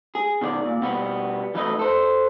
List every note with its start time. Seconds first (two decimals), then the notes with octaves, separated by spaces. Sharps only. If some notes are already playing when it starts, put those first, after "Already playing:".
0.15 G#4
0.41 B2 D#3 C5 D5
0.66 A#2
0.82 B2 G3 B3
1.55 E3 F#3 A3 D#4 B4 D#5
1.79 A4 C5